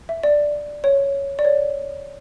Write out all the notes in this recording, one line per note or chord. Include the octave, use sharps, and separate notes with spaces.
E5
D5
C#5
D5
C#5